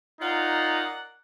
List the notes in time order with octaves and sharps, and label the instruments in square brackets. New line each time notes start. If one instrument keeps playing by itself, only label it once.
[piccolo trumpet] D#4 [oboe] F4 [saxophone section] A#4 D5 F#5